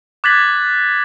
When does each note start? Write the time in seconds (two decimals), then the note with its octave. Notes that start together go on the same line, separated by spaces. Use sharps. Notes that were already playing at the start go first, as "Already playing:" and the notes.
0.24 D6 F#6 G#6 A6 B6 F#7